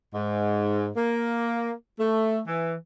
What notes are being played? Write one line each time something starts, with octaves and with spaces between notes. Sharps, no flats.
G#2
A#3
A3
E3